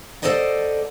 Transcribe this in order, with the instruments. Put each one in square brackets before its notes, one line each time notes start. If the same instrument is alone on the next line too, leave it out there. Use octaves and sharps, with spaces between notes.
[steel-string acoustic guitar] A4 A#4 C5 D5 D#5 F#5